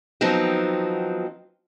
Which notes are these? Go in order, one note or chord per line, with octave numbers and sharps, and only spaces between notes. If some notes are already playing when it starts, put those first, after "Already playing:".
D#3 F3 F#3 B3 C4 D#4